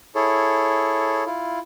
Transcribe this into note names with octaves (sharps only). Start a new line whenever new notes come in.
E4 G#4 A4 C#5
E4 F4